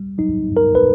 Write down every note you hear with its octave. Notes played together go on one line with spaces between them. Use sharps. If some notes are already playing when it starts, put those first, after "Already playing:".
Already playing: G3
F#3 D#4
G2
A#4
B4